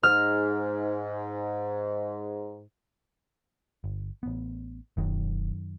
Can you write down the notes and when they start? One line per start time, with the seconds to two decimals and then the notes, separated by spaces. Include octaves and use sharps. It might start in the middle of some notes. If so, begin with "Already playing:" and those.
0.03 G#2 F6
3.84 G1
4.23 A1 B3
4.97 E1 F#2 D#3 F#3